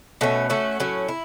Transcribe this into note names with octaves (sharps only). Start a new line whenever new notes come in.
B2 A3 C#4
A3 C#4 F#4
A2 F#3 C#4
E4